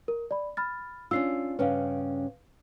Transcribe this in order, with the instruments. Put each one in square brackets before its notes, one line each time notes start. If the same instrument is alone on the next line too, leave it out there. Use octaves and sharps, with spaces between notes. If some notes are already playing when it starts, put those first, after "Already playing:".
[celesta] A#4
D5 B5
B5 F6 A6
[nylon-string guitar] C#4 D4 F4 [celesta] E6 C7
[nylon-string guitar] G2 C#3 C#4 [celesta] B4 F5